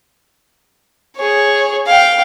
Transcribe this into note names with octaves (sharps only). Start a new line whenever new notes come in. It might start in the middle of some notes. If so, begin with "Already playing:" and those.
G#4 C#5
F5 G5